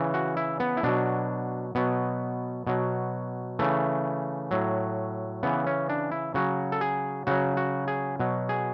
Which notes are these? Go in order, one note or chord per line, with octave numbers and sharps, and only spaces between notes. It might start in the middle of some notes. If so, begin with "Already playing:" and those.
Already playing: C#3 E3
F#4
E4
B3
E4
B2 F#3 D4
B2 F#3 B3
B2 F#3
C#3 E3 A3
A2 F#3
C#3 E3 B3
C#4
D4
E4
C#3 F#3 F#4
A4
G#4
C#3 F#3 F#4
F#4
G#4
B2 F#3
G#4